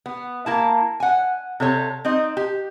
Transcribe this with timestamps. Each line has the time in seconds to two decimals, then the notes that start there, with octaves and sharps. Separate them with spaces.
0.06 B3
0.46 A#3 E4 A5
1.00 F#5 G#5
1.60 C3 A4 C#5
2.05 C4 D#4 D#5
2.37 G4